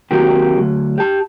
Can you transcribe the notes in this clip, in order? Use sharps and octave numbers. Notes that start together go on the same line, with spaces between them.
D#3 F#3 A#3 C4 F#4 G4
D2 F#3
G4 A5